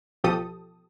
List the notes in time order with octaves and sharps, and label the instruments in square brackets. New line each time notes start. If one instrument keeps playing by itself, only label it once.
[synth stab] A1 B2 F3 G4 A4 D#6